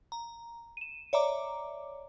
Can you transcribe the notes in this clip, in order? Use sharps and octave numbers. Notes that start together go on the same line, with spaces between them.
A#5
D#7 E7
C#5 D5 E5 A#5 D6